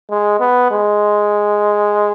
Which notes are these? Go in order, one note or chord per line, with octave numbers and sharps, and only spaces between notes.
G#3
B3
G#3